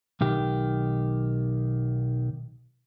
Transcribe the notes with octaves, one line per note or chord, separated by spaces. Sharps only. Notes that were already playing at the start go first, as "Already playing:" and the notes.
B1 D#3 G4